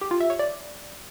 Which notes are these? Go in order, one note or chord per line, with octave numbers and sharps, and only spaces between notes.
G4
F4
E5
C#5
D5